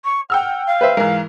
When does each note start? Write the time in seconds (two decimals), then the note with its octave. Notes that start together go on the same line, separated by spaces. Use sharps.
0.05 C#6
0.30 F#5 G5 E6 F6
0.67 F5
0.81 B4 C5 E5
0.97 G#2 E3 A#4